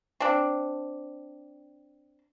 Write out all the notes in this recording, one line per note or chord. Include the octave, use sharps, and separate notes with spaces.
C4 D4